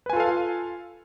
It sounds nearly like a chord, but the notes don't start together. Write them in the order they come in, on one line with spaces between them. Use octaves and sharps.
B4 G#5 F4 A4 F5